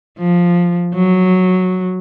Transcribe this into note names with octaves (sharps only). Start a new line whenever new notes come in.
F3
F#3